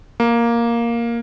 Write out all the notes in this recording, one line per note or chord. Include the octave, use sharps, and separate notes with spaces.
A#3